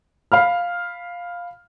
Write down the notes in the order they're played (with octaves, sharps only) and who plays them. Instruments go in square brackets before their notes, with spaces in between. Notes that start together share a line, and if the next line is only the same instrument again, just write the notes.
[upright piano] F5 B5 F6